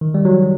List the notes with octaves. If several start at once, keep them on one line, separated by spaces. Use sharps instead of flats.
D#3
G3
F#3